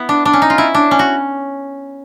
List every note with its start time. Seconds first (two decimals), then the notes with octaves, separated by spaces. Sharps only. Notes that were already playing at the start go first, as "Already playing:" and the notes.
Already playing: B3 E4
0.09 D4
0.25 D4
0.33 C#4
0.42 D#4
0.50 F4
0.58 E4
0.74 D4
0.91 C#4
0.99 F#4